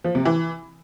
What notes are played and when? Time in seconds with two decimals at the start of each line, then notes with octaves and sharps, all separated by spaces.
0.04 F3
0.15 C3
0.25 E3